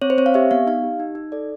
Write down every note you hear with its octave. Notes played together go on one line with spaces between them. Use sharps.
C4 C#5
C5
C4 C#5
F5
G4 E5
B3 F5
D#4 F5
G4
D#4
D#4
A4 D5